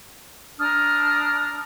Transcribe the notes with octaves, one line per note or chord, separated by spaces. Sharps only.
D4 A#5 D#6 F6